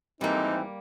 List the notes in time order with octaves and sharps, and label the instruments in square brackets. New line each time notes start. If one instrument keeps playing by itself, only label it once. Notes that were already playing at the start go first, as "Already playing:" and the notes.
[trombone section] G#1 E3 C4 [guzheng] G3 A#3 [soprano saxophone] D#4